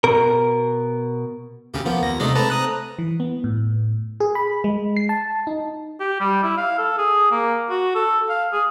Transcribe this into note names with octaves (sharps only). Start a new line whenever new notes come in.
B2 A#4
D2 C#3 G4
F3 A#3 B3
D#2 A#6
C3 G#3 A3 D4 D#4
A3 C4 B4 A5 A#5
A#5 D#6 F#6
E3
B3
A2
G#4
B5
G#3
C7
A5
D#4
G4
G3
E4
F5
A4
G#4
A#3
F#4
A4
F5
G#4